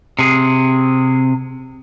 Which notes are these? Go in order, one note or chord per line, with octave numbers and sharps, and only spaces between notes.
C3 G#4